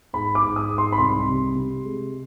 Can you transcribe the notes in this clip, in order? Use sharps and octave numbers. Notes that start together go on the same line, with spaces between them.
G#2 B5
D6
G#2
D#6
G#2
C6
B5
C2 C6
C3
C3
G#3